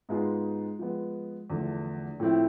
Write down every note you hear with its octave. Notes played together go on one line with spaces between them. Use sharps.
G#2 G#3 B3 F4 G#4
F3 G#3 B3
E2 D3 F3 A3
A2 F3 A3 C4 E4